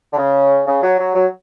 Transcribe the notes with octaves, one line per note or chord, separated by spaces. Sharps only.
D3
C#3
C#3
F#3
F#3
F#3